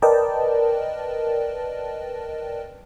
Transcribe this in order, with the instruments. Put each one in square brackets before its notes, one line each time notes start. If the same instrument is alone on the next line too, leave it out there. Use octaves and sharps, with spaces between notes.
[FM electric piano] A#4 B4 D5 D#5 G5 A5